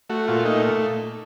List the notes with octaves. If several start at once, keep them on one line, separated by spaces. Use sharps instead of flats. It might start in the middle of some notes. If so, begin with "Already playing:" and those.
A3 F#4
A#2 F4
A3 D#4